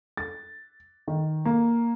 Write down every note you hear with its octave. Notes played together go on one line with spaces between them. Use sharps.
A6
D#3
A#3